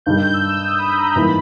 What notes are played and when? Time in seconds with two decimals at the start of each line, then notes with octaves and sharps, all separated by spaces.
0.06 G2 D#3 G3 G6
0.34 E6
0.61 D#6
0.78 B5
0.97 A#5
1.15 G#2 E3 G3 A#3 E4 B5